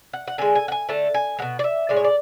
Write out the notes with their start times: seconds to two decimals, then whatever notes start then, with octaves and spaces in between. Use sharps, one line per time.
0.13 F#5
0.27 F#5
0.38 D3 G#3 G#5
0.55 G#5
0.68 F#5
0.72 G#5
0.89 D3 A3 A5
1.14 G#5
1.39 B2 G#3 F#5
1.59 D5
1.64 E5
1.89 A2 G#3 D5
1.96 C#5
2.04 D5